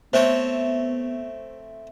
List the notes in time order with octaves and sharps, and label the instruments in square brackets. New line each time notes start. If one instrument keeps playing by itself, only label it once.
[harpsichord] A3 C4 C#5 [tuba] B3 [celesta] C5 [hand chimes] E5